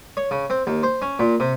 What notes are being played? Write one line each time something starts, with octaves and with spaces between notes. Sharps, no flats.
C#5
C#3
C4
D#2
C5
C#4
A#2
C3